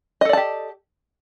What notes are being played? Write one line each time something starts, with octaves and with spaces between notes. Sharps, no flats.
G4 A4 D5 D#5 A5